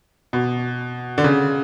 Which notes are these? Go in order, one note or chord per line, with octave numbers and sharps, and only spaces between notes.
B2
D3
C#3